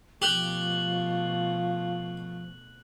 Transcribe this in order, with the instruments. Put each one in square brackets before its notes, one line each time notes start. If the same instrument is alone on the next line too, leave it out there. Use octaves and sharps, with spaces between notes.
[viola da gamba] B2 A3 [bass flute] F3 [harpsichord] G4 [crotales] F#6 F#7